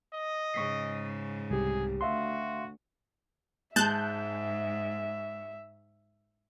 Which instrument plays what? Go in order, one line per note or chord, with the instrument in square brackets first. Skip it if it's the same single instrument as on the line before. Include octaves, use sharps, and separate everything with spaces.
[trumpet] D#5
[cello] G#2 C#3 [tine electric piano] C#6 B6 C7
[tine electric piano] C2 G4 [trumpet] G#4
[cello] D2 [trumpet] F#4 [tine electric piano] E5 F5 C6
[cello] G#2 [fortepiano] G#3 [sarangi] E5 [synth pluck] A5 F#6 G6